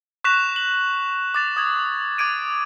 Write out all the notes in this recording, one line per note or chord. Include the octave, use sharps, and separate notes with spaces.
C#6 F#6 A#6 B6 E7 F7
F#7
D6 A6 E7
D#6 G#6
D6 G#6 D7 D#7